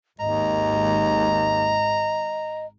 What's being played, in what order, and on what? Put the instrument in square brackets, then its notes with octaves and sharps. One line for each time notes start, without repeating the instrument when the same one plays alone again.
[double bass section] G#1 [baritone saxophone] D#2 [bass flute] D#5 [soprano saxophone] A#5